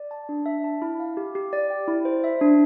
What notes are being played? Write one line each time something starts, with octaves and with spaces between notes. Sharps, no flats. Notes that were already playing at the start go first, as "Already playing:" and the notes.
Already playing: D5
A5
D4
E5
A5
E4
F5
G4
G4
D5
G5
E4
C5
E5
D4